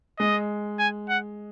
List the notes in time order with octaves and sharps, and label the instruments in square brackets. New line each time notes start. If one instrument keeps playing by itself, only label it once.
[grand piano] G#3 [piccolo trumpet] D#5
[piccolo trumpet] G#5
F#5